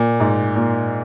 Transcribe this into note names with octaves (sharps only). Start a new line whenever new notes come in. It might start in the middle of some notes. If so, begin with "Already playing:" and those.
Already playing: A#2
G#2
A#2